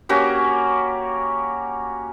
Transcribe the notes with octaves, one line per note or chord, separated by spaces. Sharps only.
A#3 C#4 F#4 G4